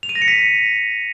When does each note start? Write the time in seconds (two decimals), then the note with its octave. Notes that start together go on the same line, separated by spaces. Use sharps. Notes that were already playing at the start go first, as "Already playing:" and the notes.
0.03 F7
0.09 D#7
0.15 A#6
0.22 C#7
0.28 B6